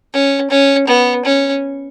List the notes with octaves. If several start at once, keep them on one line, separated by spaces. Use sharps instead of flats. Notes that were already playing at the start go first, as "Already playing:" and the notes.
C#4
C#4
B3
C#4